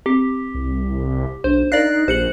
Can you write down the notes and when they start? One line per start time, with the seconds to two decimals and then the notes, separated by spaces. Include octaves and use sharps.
0.06 C4 G4
0.55 C2
1.44 B1 D4 C5
1.72 D#4 A#4 D5 F5 F#6 A#6 C7
2.08 A#1 G4 G#4 C5 C#7 F#7